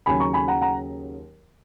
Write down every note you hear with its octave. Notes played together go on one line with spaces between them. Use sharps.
D#2 C#3 F#3 G#5 B5
A#5 C#6
G#5 B5
F#5 A#5
F#5 A#5